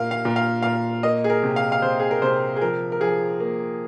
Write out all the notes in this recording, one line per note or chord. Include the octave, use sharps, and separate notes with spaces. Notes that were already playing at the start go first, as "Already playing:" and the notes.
Already playing: A#2 A#3 F5
F5
A#2
F5
A#2 F5
A#3 D#5
G#4
A#4
C3
F5
F5
C3 C5
G#4
A#4
C3 C5
G#4
F3 A#4
A#4
F3 G#4
A#3